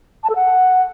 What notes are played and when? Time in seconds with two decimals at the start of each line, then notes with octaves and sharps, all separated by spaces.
0.24 A5
0.30 A4
0.35 F#5